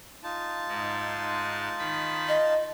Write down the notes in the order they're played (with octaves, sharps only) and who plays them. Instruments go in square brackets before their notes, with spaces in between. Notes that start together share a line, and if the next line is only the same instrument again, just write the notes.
[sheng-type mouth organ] D#4 F4 A5
[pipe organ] G#2 G#3
D#3 B5
[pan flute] D#5